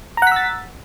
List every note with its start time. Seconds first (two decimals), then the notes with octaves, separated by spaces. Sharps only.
0.17 A#5
0.22 F#5
0.27 B6
0.32 E6
0.36 A6